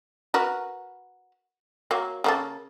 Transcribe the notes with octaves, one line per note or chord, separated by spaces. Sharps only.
F#4 A#4 B4
F#3 A#3
C#3 A#3 A4